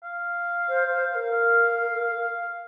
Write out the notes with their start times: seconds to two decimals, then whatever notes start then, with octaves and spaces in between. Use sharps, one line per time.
0.03 F5
0.68 C5
0.89 C5
1.11 C5
1.15 A#4
1.32 F5